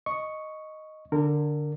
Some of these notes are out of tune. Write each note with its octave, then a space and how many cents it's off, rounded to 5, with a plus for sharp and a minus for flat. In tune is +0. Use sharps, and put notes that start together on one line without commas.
D#5 +0 C#6 +0
D3 +0 A#4 -20